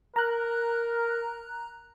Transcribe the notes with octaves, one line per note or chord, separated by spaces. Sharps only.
A#4 A#5 F#6